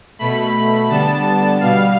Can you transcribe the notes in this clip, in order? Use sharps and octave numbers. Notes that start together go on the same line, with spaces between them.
B2 A3 B5
D3 G3 B3 A5
B2 G3 B3 F5